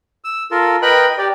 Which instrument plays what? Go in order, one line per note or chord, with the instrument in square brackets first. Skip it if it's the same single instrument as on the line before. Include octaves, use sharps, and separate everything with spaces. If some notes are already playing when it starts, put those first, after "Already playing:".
[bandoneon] E6
F4 A4 A#4
A#4 B4 D#5 G5 B5 F#6
G4 D5